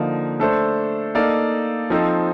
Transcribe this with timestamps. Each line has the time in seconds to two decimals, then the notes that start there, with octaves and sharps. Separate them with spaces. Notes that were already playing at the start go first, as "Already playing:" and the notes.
Already playing: D3 F3 A#3 D#4
0.40 A3 D4 A4 C5
1.15 A#3 D#4 A4 D5 F5
1.90 F3 C4 D#4 A4